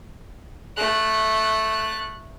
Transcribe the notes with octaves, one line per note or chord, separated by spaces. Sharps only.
A3 F#6